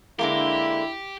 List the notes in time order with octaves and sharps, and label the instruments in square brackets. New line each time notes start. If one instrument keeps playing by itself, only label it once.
[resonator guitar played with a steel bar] D3 G#3 A#3 [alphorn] E4 [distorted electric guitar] G4